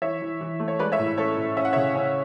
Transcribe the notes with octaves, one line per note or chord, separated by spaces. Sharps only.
E3 C#5 E5
E3
E3
A3
C#5
G#3 B4 D5
C#5 E5
A2
C#4 A4 C#5
A2
C#4 E5
F#5
C#3 C#5 E5
C#4